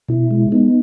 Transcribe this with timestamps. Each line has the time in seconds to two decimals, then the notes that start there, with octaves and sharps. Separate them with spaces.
0.09 B2 E4
0.31 G#3
0.52 B3 D#4